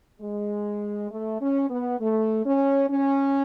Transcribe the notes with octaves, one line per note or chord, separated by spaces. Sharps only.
G#3
A3
C#4
B3
A3
C#4
C#4